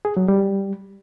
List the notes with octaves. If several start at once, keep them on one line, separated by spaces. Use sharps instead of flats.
G#4
F#3
G3